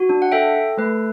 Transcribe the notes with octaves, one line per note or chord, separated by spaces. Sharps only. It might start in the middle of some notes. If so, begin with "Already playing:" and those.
Already playing: F#4
D4
F#5
A4 E5 G5
A4
A3 B4